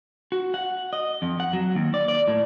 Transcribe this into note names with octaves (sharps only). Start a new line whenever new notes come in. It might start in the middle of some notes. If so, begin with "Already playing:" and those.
F#4
F#5
D#5
F2
F#5
F#3
D#2
D5
D5
A2